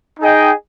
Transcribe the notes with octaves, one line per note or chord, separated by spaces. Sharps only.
D#4 G#4 D#5 G5